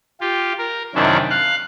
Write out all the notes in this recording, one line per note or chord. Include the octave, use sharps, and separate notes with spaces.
F4 G4
A#4
F#2 C3 D#3 C#4 D4 E4
F5 F#6